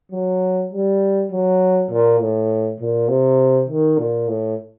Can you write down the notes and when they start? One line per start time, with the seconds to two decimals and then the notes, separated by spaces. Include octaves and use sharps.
0.12 F#3
0.72 G3
1.32 F#3
1.90 A#2
2.20 A2
2.80 A#2
3.09 C3
3.69 D#3
3.99 A#2
4.28 A2